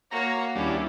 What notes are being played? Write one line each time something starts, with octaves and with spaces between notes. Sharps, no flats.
A#3 F#4 C#5 A#5
D#2 G3 C#4 D4 E4